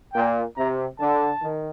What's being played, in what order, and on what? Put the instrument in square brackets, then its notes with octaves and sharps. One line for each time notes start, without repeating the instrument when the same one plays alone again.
[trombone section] A#2 [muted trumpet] G5
[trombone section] C3 [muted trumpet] A#5
[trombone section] D3 [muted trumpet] A5
[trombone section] D#3